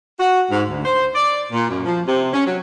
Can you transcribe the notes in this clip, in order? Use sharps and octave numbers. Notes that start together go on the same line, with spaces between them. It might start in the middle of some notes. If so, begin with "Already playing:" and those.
F#4
G#2
D2
C5
D5
A#2
F#2
F3
C3
C#4
F#3